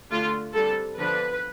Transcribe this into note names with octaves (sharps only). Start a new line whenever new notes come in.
D3 A3 D4 F4
D3 G3 C4 A4
D3 F3 B3 D4 B4